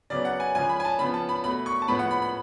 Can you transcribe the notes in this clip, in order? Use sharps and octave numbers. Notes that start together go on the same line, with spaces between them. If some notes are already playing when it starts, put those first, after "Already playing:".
C#3 F#3 B3 D5
F#5
G#5
C#3 F3 G#3 G#5
B5
G#5
A5
C#3 F3 B3 B5
A5
B5
B2 A3 B5
C#6
A5
A2 F3 G#3 B3 B5
F#5
B5
B5